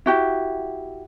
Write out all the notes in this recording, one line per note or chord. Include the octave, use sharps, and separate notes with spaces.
E4 F#4 G4